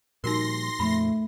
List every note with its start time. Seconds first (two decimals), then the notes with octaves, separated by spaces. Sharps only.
0.24 A#2 F3 G3 D#4 F#4 A#4 C6 A#6
0.80 F2 A#2 F3 A3 B5